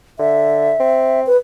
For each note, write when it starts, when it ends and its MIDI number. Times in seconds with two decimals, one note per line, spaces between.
0.19 0.73 50
0.19 1.21 76
0.80 1.27 60
1.27 1.37 71